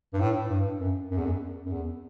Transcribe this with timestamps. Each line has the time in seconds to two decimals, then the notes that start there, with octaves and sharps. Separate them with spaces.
0.13 G2
0.20 A2
0.49 G2
0.80 F#2
1.11 F#2
1.18 E2
1.25 F#2
1.65 F#2
1.72 E2